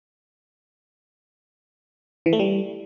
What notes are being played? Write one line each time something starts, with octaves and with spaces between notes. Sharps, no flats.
E3
A3
G3